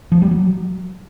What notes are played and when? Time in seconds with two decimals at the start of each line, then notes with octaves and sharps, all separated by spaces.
0.12 F3
0.22 G3
0.31 F#3